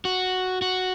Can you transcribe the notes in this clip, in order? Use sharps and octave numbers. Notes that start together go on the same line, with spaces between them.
F#4
F#4